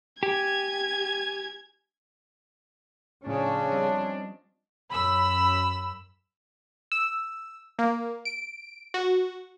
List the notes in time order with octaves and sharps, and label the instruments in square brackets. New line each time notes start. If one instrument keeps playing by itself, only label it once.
[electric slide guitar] G4 [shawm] G#5 [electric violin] G#6
[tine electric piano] A2 [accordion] C#3 [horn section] F3 D4 [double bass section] C#4
[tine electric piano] G3 C4 D#5
[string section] F#2 B5 E6
[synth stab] E6
A#3
D7
F#4